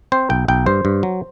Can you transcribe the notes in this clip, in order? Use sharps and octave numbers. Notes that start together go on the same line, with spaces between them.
C4 C5
B1 G5
B1 G5
G2 C5
G2
F#3